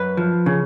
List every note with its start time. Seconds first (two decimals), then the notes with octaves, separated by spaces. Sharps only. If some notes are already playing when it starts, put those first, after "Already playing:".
Already playing: F#2 B4
0.17 F3
0.46 C#3